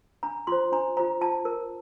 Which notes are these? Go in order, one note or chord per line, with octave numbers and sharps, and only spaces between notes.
D4 A#5
F4 C5 C6
D4 A#5
F4 C5 A#5
F4 A5
A#4